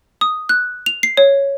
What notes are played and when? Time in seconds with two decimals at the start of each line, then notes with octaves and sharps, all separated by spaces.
0.21 D#6
0.49 F#6
0.86 F7
1.03 C7
1.17 C#5